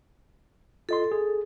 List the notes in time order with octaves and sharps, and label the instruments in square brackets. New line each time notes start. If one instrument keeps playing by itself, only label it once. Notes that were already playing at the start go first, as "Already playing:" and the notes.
[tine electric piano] F4 D#5 C6 [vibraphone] A4
[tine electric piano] G#4